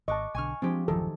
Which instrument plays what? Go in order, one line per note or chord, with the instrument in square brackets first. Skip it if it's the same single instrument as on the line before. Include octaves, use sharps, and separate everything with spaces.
[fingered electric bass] G#1 [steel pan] D#5 A5 [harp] C#6 D6 F#6
[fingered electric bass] B1 D3 [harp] G#5 C#6 F6
[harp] F3 G#3 G4 [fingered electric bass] C4 D4
[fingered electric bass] D1 F#2 F3 [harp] D#3 [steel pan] A4